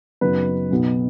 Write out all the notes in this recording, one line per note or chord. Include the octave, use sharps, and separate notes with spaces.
F#2 C#3 F#3 B3 D#4 B4
B1 B2 B3 D#4